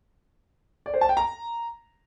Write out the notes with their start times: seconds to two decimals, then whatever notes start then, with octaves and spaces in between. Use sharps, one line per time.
0.86 D5
0.94 C5
1.01 A5
1.09 G5
1.17 A#5